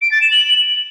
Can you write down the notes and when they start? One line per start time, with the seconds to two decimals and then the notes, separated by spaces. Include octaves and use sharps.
0.02 D7
0.11 A6
0.21 E7
0.31 F#7